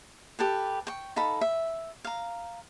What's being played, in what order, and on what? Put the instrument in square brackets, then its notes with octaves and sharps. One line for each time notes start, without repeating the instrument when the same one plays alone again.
[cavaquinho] G4 A4 B4
G5 C#6
D#4 A4 F5 B5
E5
F5 A#5